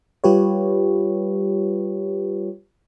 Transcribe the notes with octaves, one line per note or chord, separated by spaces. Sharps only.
G3 F4 G4 B4 C#5